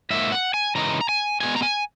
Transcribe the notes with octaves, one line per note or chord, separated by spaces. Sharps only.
G#2 F#3 A#3 E5
F#5
G#5
C#3 E3 G#3 D#4 A#5
A#5
G#5
B2 G#3 B3 G#5
A#5
G#5